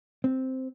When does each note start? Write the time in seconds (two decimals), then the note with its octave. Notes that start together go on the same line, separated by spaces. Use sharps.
0.24 C4